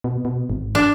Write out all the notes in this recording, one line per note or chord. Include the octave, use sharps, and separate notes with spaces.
B2
B2
G#1
D4